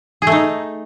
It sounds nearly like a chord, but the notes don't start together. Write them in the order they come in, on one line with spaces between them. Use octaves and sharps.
G#4 A3 D#4